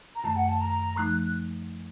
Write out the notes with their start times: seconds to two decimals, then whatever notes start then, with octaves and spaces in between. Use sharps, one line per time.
0.16 A#5
0.24 F#2 D#3 A3 A5
0.36 F#5
0.49 A5
0.61 A#5
0.97 F3 A3 D#4 F#6